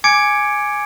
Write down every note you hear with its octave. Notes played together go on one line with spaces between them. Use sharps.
G#5 D6 G#6 C#7 D7